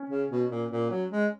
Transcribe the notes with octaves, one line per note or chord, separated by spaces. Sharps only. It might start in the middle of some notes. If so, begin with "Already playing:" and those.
Already playing: C#4
C#3
B2
A#2
A#2
F#3
G#3